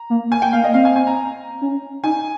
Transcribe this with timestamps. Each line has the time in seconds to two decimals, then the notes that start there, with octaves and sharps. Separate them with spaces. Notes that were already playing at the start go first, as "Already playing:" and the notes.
Already playing: A#5
0.10 A#3
0.30 A#3 G#5
0.42 G5
0.53 A#3 F5
0.64 D#5
0.74 C4 F5
0.85 G#5
0.96 G#5
1.07 A#5
1.61 C#4
2.04 D#4 G#5